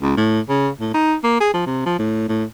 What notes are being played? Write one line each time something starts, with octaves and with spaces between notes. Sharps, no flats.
C#2
A2
C#3
A2
D#4
A#3
G#4
F3
C3
F3
A2
A2